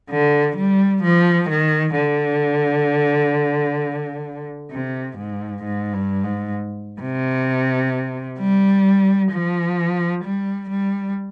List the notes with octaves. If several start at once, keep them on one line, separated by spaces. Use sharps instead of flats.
D3
G3
F3
D#3
D3
C3
G#2
G#2
G2
G#2
C3
G3
F3
G3
G3